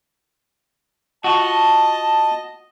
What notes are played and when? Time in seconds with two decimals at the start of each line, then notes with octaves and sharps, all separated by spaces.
1.24 F4 F#4 D#5 A5